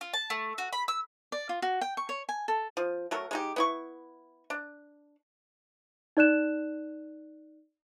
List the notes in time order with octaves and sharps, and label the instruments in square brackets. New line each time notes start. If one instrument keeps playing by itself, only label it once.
[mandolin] F4
A5
A3
F#4
B5
E6
[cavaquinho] D5
F4
F#4
G5
C#6
C#5
G#5
A4
[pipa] F3
F#3 A3 A#4
G#3 D#4 G4
B3 E4 C#6
D4
[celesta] D#4 D5 F#6 E7